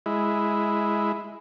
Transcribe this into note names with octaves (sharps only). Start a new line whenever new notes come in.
G#3 E4